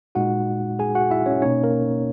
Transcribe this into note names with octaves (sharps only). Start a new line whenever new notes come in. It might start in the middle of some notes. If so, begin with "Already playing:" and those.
A#2 G#3 D#4 F#4 F#5
G#4 G#5
F#4 F#5
E4 E5
C#4 C#5
B2 A#3 C#4 D#4 C#5
A#3 A#4